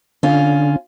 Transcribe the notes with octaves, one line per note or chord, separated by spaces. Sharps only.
D3 C#4 F4